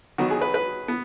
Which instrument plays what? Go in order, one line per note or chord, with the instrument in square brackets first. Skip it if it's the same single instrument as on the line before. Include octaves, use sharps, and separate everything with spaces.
[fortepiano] D#3 F#3 B3 F#4
G#4
B4
B4
B3